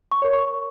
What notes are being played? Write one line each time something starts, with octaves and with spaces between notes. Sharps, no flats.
C#6
A#4 C#5
C#6